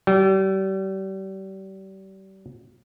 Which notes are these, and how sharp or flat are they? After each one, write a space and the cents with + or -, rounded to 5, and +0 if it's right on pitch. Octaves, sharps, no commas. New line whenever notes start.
G3 -35